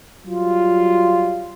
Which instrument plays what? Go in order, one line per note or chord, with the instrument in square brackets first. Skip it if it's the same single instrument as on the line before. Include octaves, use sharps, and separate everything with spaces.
[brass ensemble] F#3 G3 F4